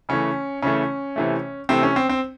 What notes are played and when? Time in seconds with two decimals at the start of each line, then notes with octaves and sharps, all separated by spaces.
0.09 C#3 E3 A3 C#4
0.62 C#3 E3 A3 C#4
1.16 C3 E3 A3
1.69 C3 E3 A3 C4
1.83 C#4
1.96 C4
2.09 C4